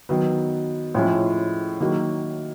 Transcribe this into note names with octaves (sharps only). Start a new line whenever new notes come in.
D#3 F#3 B3
A2 F3 G#3 C#4
D#3 F#3 A#3 D#4 F#4